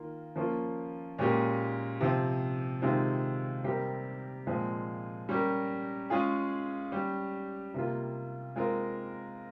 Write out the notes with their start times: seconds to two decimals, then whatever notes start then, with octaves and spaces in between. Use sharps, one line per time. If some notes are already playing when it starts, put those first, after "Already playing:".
Already playing: D#3 A#3 F4
0.35 F3 A#3 C#4 F4
1.18 A#2 G#3 C#4 G4 A#4
2.00 C3 F3 C4
2.82 C3 D#3 G#3 C4 F4
3.64 C3 G3 C4 G4 A#4
4.47 A#2 F3 G#3 C4
5.29 G3 C#4 G4 A#4
6.10 G#3 C#4 F4 G#4
6.92 G3 C#4 G4
7.74 C3 G3 A#3 F4
8.56 G#3 C4 F4 A#4